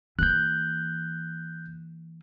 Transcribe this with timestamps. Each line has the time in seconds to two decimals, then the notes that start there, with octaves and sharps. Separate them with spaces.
0.19 E3 A#3 F#6 G6